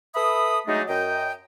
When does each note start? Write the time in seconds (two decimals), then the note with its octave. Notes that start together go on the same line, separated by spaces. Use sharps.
0.15 A4 B4 E5 B5 D#6
0.67 F#3 G#3 A3 D4 D#4
0.88 F#2 D#5 G5